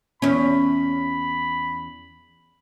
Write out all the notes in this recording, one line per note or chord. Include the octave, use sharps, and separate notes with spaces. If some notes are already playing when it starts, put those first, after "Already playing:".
E2 C#4 B5